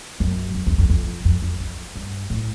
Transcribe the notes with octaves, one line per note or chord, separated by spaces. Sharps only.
F#2
F2
E2
F2
F2
F2
F2
F2
G2
A2